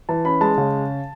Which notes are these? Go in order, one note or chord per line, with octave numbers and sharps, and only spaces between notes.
E3 A5
C#4 B5
G#3 A5
C#3